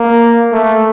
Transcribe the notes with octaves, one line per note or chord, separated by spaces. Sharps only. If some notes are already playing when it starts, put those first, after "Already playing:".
Already playing: A#3
A3